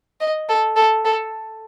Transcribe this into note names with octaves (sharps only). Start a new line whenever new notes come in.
D#5
A4
A4
A4